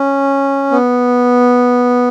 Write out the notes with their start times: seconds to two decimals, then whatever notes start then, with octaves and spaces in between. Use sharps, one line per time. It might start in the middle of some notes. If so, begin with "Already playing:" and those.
Already playing: C#4
0.71 B3